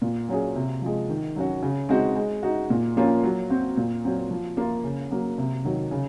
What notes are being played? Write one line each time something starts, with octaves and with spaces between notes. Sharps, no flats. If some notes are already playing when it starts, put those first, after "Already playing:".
A#2
F#3 C#4 G#4
C3
F3 G#3
D#3
F#3 C#4 F#4
C#3
G#3 C4 D#4 F#4
G#3
D#4 F#4
A#2
F3 A#3 C#4 F4
F#3
C4 F#4
A#2
F#3 C4
F3
A#3 F4
C#3
F#3 A#3
C3
D#3 F#3
C#3